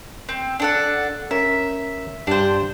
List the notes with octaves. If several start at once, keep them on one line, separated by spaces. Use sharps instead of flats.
C4
D4 A4 F#5
C#4 A#4 E5
G2 D4 G4 C5